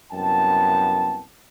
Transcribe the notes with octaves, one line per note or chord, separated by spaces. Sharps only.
C2 F#2 B3 E4 G5 A5